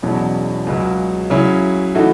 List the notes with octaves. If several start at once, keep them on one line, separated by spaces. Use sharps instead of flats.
E1 E2 B2 F#3 C#4
C#2 C#3 F#3
C#3 F#3 C#4 E4
A2 E3 A3 D#4 F#4